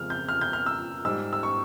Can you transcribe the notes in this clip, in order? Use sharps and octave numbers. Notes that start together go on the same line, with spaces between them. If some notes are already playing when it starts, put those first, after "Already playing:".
Already playing: F2 C#3 F3 G#3 F6
G6
F6
G6
F6
E6
G#2 G3 E6
E6
C#6